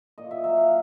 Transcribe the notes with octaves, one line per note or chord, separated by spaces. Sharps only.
A#2 D#5
E5
F#3 E5
F5